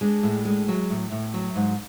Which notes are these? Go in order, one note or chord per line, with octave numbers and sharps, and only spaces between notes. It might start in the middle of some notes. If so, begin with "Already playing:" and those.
G#3 D4
A2
G#3
F#3
A2
A2
F#3
G#2